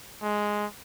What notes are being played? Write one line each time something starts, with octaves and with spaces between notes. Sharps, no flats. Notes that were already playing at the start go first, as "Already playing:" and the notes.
G#3